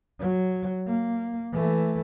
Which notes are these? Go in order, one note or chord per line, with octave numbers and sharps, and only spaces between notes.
F#3
A#3
E3 A3